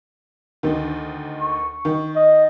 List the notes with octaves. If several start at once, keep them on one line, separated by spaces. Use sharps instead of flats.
D2 D#3
C#6
D#3
D#5